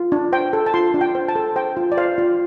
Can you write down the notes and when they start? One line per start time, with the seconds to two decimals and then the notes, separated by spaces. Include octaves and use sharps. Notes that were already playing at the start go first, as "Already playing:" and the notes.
Already playing: F4
0.12 D4
0.32 C5 G5
0.53 A4
0.66 A5
0.74 F4 C6
0.94 D4
1.01 G5
1.15 C5
1.28 A5
1.35 A4
1.56 C5 G5
1.77 F4
1.92 D5
1.97 C5 F5
2.18 F4